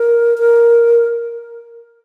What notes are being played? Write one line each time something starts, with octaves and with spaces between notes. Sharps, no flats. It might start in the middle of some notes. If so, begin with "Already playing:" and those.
Already playing: A#4
A#4